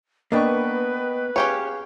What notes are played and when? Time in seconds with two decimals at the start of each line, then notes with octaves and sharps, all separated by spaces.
0.32 A#3 B3 D4 B4 D#5 G5 C#6
1.36 C#4 G4 G#4 C#5 F5